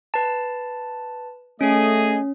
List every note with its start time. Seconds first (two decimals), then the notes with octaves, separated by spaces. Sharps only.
0.14 B4 A5
1.61 A3 C#4 G#4 D#5